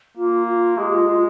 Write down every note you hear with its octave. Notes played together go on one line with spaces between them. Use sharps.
A#3 F4
F4
G#3 G4
F4
F4